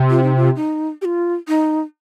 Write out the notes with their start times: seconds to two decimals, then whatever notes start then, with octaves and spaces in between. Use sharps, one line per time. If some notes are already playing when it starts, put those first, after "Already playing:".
Already playing: C3
0.10 F4
0.23 D#4
0.36 F4
0.56 D#4
1.02 G4
1.05 F4
1.48 D#4